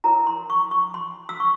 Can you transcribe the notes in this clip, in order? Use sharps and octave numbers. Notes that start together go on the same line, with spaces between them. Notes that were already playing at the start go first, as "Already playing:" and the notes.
E4 A#4 C#5 A#5
C6
C#6
C#6
C6
E6
C#6